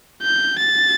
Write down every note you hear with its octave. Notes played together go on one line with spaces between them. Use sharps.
G6
A6